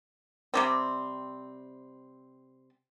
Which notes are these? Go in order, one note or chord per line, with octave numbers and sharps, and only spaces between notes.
C3 G3 C4